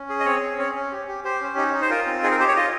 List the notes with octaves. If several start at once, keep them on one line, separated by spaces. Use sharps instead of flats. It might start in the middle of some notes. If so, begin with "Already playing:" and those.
Already playing: C#4
G#4
D#5
C4 C#5
C4
C#4 C#5
C#4
G4
G4
G4 C5
C#4
D#4
D#4
C5
F4 A#4
C4
D#4 G#4
A#4
G4 C5
C#5
F4 D#5